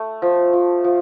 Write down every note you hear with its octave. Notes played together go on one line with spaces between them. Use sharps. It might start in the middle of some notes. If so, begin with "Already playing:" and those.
Already playing: A3
F3
F3
F3